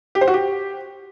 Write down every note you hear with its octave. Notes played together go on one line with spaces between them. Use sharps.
G4
C5
F#4
G4